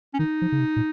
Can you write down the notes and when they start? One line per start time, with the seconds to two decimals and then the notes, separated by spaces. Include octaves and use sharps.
0.14 C#4
0.19 D#3 D#4
0.42 F3
0.52 C#3
0.60 C3
0.76 A#2